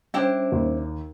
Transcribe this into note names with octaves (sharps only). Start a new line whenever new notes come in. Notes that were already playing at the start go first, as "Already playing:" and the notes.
G3 C#4 D4 E4 C5 G5
D#2